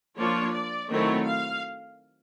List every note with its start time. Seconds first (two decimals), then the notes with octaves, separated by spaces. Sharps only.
0.18 F3 A#3 D4 F4 C#5
0.54 D5
0.89 D#3 F#3 A3 C4 E4 C#5
1.25 F5